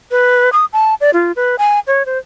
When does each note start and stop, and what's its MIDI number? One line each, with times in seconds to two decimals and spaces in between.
0.11 0.50 71
0.53 0.65 87
0.73 0.95 81
1.01 1.11 74
1.13 1.32 65
1.36 1.56 71
1.58 1.80 80
1.87 2.05 73
2.06 2.18 72